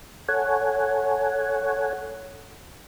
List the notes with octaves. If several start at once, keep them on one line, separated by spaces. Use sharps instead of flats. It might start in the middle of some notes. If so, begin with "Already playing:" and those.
A4 C#5 F#5 G#5